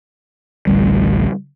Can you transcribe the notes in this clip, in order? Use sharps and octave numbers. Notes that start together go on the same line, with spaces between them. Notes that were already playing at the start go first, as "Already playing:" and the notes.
A1 D2 G3